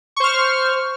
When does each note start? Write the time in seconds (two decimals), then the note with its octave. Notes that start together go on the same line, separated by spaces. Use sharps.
0.16 C#6
0.20 C5
0.24 F6